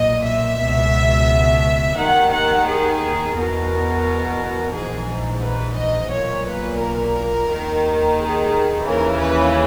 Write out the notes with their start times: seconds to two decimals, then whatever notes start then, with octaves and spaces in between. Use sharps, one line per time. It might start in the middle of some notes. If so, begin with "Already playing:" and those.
Already playing: B1 A#2 D#5
0.23 E5
0.58 C#2 B2
1.96 D#2 D#3 F#5
2.31 F#5
2.65 G#4
3.34 E2 B2 A#4
4.72 A#1 G#2 E3 G#4
5.41 B4
5.76 D#5
6.10 B1 A#2 C#5
6.44 B4
6.79 A#4
7.48 D#2 D#3
8.17 G#4
8.86 D#2 C#3 E3 A#4
9.20 B4